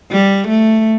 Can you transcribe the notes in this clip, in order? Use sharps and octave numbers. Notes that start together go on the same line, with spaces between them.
G3
A3